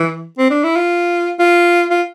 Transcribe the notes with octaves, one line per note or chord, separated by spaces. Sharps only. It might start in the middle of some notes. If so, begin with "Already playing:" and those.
Already playing: E3
C4
D4
E4
F4
F4
F4